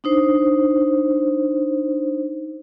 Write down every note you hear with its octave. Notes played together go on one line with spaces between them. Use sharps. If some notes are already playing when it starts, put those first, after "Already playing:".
D4 D#4 C5